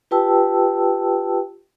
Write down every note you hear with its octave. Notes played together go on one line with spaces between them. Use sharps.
F4 G4 B4 G5 A5 E6